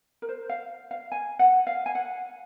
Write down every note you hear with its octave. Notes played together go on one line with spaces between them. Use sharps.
A#4
C5
F5
F5
G#5
F#5
F5
G#5
F#5